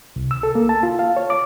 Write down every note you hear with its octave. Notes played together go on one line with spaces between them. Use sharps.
C2
E6
A4
A#3
A5
F4
F5
C#5
D6